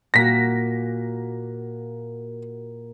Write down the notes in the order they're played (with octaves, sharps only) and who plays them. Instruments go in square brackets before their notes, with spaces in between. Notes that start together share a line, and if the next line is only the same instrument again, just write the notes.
[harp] A#2 A#3 F#4 [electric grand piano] A#6 B6